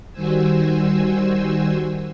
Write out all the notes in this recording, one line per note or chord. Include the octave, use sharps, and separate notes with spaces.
D#3 G3 F#4 C5 G#5 E6